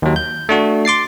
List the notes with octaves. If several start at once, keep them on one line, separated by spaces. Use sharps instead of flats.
D#2 F#3
G6
A3 D4 F#4
C6 D6 A6 C7